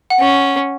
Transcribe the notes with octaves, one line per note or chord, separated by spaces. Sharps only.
F#5
C#4